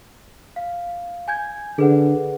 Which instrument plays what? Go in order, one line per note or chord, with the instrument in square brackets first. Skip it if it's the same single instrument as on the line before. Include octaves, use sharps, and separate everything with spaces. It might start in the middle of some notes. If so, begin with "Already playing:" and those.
[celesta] F5
G#5 G6 G#6
[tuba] D3 [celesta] G#4 B4 F#5